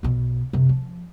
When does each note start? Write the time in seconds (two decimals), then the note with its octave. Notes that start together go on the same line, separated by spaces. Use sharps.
0.03 B1 B2
0.53 F#2 C3
0.69 F3